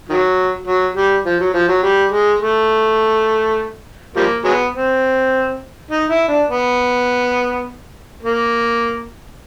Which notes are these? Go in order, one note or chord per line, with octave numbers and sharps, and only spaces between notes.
D#3 F#3
F#3
G3
F3
F#3
F3
F#3
G3
G#3
A3
F3 G3 A#3
F#3 G#3 B3
C4
D#4
E4
D4
B3
A#3